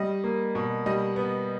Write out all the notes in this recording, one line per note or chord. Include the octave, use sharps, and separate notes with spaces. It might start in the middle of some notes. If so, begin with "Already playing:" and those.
Already playing: G3 D#5
A#3
B2
G3 D#5
B3